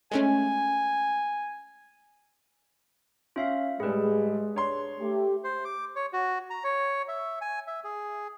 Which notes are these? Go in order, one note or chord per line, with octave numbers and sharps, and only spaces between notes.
G#3 A3 C#4 G#5
C#4 F4 E5 F5
A2 G3 G#3 G#4 B4
D4 C#5 C6
A3 G4
C5
D6
C#5
F#4
A#5
C#5
E5
G#5
E5
G#4